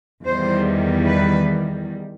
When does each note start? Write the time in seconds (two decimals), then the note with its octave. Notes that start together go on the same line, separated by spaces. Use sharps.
0.24 E2 D#3 G3 C5
1.05 B4